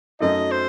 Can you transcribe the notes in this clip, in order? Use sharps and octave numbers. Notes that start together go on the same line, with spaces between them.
F#2 F#3 A3 D#4 D#5
C5